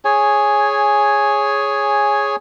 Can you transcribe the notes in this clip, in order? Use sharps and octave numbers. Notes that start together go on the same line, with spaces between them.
G#4 C#5 G#5